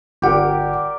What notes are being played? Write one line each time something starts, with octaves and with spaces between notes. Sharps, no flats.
G1 G4 A#4 D5 F#5